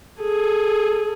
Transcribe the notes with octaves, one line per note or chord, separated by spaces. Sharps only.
G#4 A4